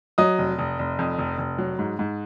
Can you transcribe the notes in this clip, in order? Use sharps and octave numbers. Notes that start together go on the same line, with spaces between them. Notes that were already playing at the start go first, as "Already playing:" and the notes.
F#3 D#5 D#6
F1
F1
F1
F2
F1
F1
F#3
G#2
G#2